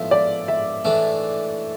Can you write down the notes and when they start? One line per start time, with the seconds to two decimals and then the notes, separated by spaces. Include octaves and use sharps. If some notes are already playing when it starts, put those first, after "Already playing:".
Already playing: A2 F3 B3 F4 E5
0.11 D5
0.48 E5
0.85 A2 E3 A3 D4